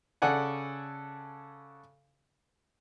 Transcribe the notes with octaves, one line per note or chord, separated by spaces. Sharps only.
C#3 A4 D5 F#5 G#5